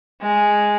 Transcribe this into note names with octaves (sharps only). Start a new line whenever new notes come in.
G#3